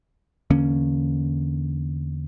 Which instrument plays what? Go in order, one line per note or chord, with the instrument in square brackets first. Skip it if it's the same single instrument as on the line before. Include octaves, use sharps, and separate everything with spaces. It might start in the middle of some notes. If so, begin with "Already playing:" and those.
[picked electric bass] E2 D3 A#3 C#4